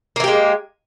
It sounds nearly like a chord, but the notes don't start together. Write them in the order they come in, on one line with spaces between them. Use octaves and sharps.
A#3 E3 G4 G#3